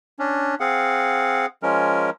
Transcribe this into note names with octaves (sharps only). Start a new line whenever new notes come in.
C#4 D4
C4 G#4 F5 F#5
F3 G#3 C#4 A#4